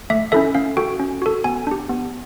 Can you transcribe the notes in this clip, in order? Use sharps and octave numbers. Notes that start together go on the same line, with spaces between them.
A3 E5
C#4 E4 A4 E5
C#4 F5
F#4 A4 G5
C#4
F#4 A4
B3 G#5
D4 G4
B3